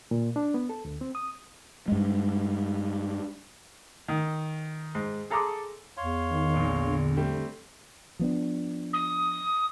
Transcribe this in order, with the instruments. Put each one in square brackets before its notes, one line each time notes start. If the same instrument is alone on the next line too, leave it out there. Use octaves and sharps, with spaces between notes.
[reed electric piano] A#2
D4
B3
A4
D2
C4
D#6
[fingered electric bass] G2 G#3
[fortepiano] D#3
G#2
G#4 A4 A#5 C6 D6 D#6
[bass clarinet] E2 [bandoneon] C#5 F5 C6
[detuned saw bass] D#3
[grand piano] A#1 A#2
[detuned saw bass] D3
[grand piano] G3 A3 C4
[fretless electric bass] F3 B3 D4
[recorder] D#6